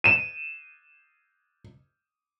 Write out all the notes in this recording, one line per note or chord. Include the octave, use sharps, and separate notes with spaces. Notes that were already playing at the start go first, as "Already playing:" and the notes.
D#7 E7